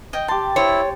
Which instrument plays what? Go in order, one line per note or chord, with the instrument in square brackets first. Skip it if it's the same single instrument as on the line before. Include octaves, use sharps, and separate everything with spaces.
[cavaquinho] D#5 G5
[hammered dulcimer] G4 A5 [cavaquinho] C6
[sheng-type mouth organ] E4 [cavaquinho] C5 [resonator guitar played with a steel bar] C#5